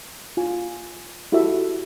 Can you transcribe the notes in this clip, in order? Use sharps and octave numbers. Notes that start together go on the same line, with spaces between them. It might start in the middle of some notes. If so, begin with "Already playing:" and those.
F4 G#5
E4 F#4 G4 A4 E5